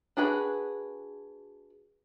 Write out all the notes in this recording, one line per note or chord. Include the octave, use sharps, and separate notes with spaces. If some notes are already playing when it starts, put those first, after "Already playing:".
D4 F#4 G#4 B4